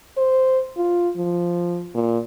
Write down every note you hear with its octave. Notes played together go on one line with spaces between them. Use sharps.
C5
F4
F3
A#2